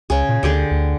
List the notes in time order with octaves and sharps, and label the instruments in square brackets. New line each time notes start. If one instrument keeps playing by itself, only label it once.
[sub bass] C#2 [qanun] C#3 G#4
[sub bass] A#2
[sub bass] D2 [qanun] D3 G4 G#4
[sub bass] D2